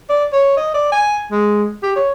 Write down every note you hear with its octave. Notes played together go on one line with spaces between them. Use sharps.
D5
C#5
D#5
D5
G#5
G#3
G4
C#5